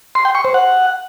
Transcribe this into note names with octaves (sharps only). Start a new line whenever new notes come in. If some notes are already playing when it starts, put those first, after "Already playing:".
C6
G5
C#6
C5
F#5